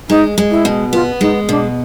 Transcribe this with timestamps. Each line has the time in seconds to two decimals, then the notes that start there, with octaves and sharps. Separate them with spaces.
0.09 G#3 D#4
0.38 G#3
0.51 E4
0.65 B2
0.93 B3 F4
1.21 G#3 D#4
1.49 B2 D4